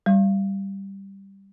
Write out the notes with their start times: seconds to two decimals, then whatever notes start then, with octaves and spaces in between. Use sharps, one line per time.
0.06 G3